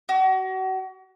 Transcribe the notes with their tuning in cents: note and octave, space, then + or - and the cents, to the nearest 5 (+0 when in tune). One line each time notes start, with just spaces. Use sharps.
F#4 +35